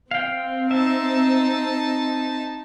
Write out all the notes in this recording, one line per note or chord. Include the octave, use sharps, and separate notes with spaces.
C4 F5 G5
D#4 E5 A5